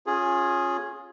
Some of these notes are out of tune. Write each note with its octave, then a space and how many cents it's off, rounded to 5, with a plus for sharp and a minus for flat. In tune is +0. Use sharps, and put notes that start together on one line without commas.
C#4 -5 F4 +25 G#4 +0